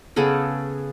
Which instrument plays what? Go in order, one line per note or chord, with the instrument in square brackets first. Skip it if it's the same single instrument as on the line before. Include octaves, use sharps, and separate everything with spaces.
[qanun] C#3 B3 G#4 A4